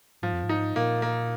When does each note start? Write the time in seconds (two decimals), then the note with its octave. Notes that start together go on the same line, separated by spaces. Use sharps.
0.22 G#2 F3
0.33 F2
0.43 G#2
0.49 D#4
0.76 A#2 A#3
1.02 A#3